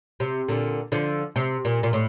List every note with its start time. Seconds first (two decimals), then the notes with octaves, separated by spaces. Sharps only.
0.20 C3
0.49 A#2 D3
0.92 D3 F3
1.36 C3
1.65 A#2
1.83 A#2
1.93 A2